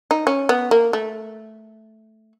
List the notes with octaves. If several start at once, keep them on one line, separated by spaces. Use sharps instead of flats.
D#4
C#4
B3
A#3
A3